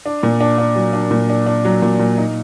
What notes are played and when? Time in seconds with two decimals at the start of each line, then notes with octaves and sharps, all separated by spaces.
0.06 D4
0.23 A#2
0.41 D4
0.58 D4
0.76 F#3
0.93 D4
1.11 A#2
1.30 D4
1.46 D4
1.65 F#3
1.82 A#2
1.99 A#2
2.18 D#4